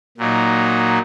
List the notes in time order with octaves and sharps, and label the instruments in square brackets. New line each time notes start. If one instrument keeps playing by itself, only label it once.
[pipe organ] A#2 F#3 A#3 D#4